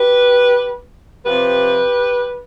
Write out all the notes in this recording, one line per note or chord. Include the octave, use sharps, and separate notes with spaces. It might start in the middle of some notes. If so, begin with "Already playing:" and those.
Already playing: G4 B4
C3 F3 G4 B4